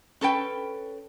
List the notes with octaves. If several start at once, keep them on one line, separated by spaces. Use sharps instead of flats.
C#4 A4 B4 G5